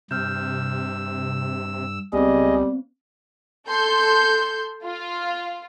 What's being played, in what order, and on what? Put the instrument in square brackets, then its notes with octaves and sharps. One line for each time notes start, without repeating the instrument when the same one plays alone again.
[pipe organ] G2 E6 [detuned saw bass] C3 [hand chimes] F6 G6
[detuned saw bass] C#2 [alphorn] G3 [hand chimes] B3 C4 [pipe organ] G#4 D#5
[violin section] A4 C6 G6
F4